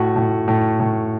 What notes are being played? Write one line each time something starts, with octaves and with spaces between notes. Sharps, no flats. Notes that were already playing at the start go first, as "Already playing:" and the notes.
Already playing: A2 F#4
A2
A2
A2